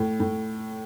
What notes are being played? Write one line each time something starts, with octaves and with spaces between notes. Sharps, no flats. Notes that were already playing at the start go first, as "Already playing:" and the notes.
Already playing: A2
A2